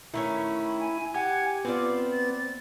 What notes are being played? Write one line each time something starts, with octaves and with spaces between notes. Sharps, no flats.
D#3 A3 C#4 E4
B5
G#5
G4 F#5 G#5
B3 C4 F4 C5 D5
A6